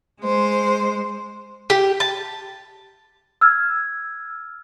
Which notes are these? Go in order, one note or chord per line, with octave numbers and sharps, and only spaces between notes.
G#3 C5
G4
A5
E6 F6 G#6